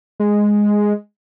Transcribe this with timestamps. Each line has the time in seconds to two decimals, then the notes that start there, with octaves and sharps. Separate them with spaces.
0.20 G#3